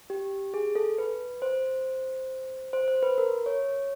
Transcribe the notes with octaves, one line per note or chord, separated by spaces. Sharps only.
G4
G#4
A4
B4
C5
C5
C5
B4
A#4
C#5